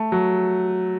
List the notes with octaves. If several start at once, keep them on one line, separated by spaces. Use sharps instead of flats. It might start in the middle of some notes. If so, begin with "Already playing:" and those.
Already playing: A3
F#3